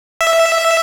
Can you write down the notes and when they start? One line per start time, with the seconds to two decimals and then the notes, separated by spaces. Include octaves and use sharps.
0.21 E5